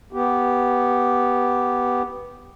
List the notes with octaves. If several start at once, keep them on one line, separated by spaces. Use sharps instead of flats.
B3 G4